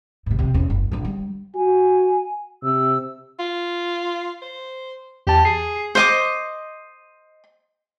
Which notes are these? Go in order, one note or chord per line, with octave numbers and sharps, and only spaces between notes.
G#2 C3
F2 C3
E2 C#4
F#1
A#1 D3
G3
F#4 G#5
C3 E6
F4
C5
E2 G4 A5
G#4 C7
C5 D#5 D6